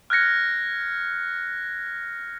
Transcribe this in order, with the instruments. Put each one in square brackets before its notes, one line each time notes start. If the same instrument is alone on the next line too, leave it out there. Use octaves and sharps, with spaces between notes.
[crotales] F6 F#6 G#6 A#6 C#7